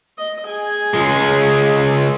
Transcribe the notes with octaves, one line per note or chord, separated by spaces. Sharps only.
D#5
G#4 G#5
C#2 G#3